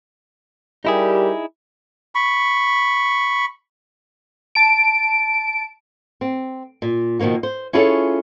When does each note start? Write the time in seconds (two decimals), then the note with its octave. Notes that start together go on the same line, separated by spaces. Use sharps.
0.85 G3 D#4 E4 G4 G#4 A#4
2.15 B5 C#6
4.55 A5 D7
6.21 C4
6.82 A#2
7.19 B2 D#3 F3 A#3 F#4
7.43 C5
7.73 C#4 E4 F4 G#4 A4 C#5